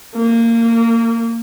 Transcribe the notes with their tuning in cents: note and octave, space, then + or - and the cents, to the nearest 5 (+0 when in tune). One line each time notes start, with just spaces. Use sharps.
A#3 -20